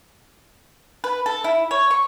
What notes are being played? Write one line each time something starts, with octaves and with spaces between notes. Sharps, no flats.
B4
A4
E4
C#5
C#6